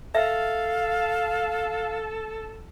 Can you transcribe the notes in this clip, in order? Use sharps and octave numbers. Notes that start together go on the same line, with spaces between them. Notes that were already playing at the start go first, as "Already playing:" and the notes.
A4 E5 F5